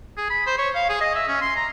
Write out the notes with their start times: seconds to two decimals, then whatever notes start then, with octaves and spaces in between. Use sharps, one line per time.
0.17 G#4
0.30 B5
0.47 C5
0.58 C#5
0.75 F5
0.89 G#4
1.01 D#5
1.15 E5
1.28 C#4
1.41 C6
1.56 A#5